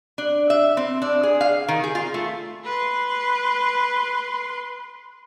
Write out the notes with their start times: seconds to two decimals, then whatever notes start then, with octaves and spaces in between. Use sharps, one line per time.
0.18 D4
0.50 E5
0.77 C4
1.02 D4
1.23 G#4
1.41 F5
1.68 D#3
1.84 G#4
1.95 F4
2.14 A3
2.65 B4 C6